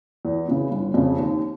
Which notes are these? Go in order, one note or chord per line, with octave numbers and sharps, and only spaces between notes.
E2
C#3 E3
G1
F2 C#3
D#2